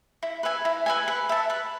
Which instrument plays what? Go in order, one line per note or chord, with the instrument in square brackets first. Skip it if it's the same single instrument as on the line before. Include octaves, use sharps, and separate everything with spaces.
[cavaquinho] E4
B4 E5 G#5
E4
B4 E5 G#5
B4
E5 A5
B4